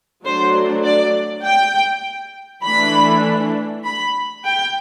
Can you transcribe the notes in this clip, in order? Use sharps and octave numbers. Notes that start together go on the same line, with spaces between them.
F#3 A3 D4 C5
D5
G5
E3 A3 D4 B5
B5
G5